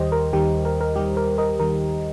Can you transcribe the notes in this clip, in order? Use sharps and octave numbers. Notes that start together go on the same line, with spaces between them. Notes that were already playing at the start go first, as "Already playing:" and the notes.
Already playing: D#2 D#3 G3 G4 C5 D#5
A#4
D#2 D#3 G3 G4
A#4
A#4
D#2 D#3 G3 G4
A#4
A#4 D#5
D#2 D#3 G3 A#4